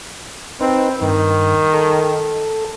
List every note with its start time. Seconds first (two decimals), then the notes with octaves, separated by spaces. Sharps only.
0.61 C4 D#4 B4
1.01 G2 D#3
1.73 A4